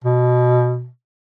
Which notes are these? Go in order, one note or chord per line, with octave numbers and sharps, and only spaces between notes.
B2